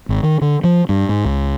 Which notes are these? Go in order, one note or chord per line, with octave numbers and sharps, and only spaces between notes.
G#1
D#3
D3
F3
G2
G#2
C#2